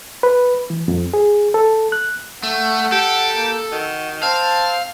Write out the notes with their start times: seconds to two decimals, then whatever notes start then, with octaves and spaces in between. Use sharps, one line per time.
0.23 B4
0.70 E3
0.88 F2
1.14 G#4
1.54 A4
1.92 F#6
2.43 A3 F#5
2.92 G4 A4
3.36 A#3
3.72 D#3 F#4
4.23 C4 F5 A5